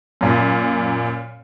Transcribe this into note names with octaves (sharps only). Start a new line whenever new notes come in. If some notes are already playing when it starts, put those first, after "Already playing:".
F#2 A#2